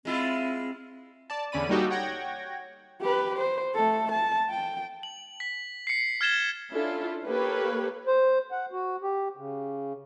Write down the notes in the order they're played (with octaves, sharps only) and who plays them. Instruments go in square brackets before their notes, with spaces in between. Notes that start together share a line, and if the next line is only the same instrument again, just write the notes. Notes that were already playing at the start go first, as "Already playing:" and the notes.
[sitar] G#3 E4 F4 [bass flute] C4
[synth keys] D5 A5
E2 D3 C#4 D5 B5 D#7
G3 A#3 D#4 F#4 G4 A4
C#5 F#5 G5 G#6 A#6
[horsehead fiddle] G4 B4
C5
A3 A4
A5
G5
[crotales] F#7
B6
C7 C#7
F6 G#6 A6 E7 G7
[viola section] C#4 D4 E4 F4 A4
A#3 G4 A4 B4 C#5
[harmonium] C5
F#5
F#4
G4
C#3